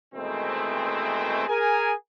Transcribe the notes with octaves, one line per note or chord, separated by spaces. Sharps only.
B2 D#3 E3 G#3 A3 C4
G#4 A#4 G#5